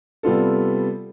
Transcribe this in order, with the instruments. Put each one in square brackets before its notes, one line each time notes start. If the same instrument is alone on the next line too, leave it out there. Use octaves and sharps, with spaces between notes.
[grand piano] C3 G3 B3 F4 A4